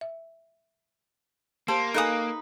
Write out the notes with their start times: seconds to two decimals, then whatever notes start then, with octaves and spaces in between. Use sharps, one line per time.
0.01 E5
1.68 A#3 G4 C5 A5
1.94 D#4 A4 B4 F5 G#5 D#6